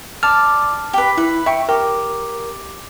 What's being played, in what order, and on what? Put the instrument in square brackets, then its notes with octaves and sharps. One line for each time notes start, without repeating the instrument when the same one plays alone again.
[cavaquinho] D5 [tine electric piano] A5 F6
[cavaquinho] G4 B4
[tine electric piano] E4 [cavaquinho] B4
[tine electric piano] E5 G5 [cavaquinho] C#6
[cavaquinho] G4 [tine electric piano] A#4